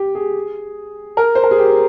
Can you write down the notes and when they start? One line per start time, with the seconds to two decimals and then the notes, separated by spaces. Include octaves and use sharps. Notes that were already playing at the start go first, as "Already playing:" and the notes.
Already playing: G4
0.15 G#4
1.17 A#4
1.35 C5
1.44 A#4
1.51 G#4
1.58 G4